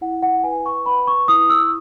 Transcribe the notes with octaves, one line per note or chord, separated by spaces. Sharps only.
E4 F#5
F#5
B4 G#5
C#6
B4 B5
C#6
E4 D#6
E6